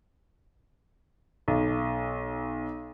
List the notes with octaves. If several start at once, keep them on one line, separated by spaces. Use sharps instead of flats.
B1